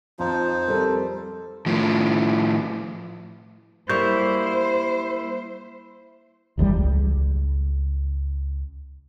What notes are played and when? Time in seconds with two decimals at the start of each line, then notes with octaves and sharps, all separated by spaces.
0.19 F2 F3 D#4 C5 A5
0.68 G3 C4 A4 A#4
1.66 A2 F3
3.89 G3 A#3 E4 C5 C#6 G6
6.58 D1 G1 E2 G3
6.79 C#2